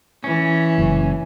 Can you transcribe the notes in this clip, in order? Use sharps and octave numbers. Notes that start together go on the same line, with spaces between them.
E3 C#4
F#1